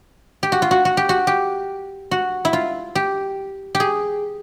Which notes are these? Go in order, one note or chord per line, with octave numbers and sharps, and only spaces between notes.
G4
F#4
F4
F#4
F#4
G4
F#4
G4
F#4
E4
F4
G4
G4
G#4